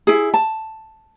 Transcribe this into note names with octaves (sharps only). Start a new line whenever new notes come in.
E4 G#4
A5